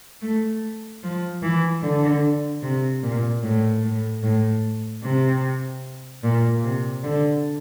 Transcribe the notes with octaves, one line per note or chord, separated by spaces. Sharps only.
A3
F3
E3
D3
C3
A#2
A2
A2
A2
C3
A#2
C3
D3